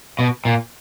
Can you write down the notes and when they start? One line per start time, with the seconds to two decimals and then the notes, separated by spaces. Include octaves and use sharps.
0.19 B2
0.45 A#2